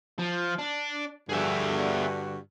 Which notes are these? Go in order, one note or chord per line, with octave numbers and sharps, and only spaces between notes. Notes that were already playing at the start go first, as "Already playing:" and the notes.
F3
D4
G2 D3 F#4 G#4 E5